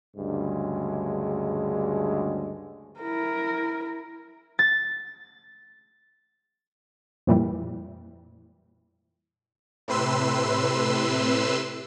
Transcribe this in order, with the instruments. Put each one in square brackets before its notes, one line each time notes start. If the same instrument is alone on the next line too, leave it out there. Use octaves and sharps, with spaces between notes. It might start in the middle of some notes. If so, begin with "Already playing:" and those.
[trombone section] D2 G2 C#3 G#3
[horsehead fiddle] E4 A#4
[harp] A6
[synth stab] F2 A#2 E3 G3
[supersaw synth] A2 C3 B4 C6 E6